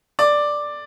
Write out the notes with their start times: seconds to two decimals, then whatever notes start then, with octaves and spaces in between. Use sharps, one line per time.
0.19 D5